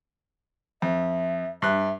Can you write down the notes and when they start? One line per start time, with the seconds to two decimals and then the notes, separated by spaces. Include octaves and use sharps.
0.82 F2 E5
1.62 G2 E5 F#6